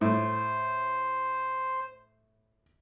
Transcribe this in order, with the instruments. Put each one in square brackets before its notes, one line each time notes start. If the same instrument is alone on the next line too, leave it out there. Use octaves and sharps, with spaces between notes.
[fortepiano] A2 [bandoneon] C5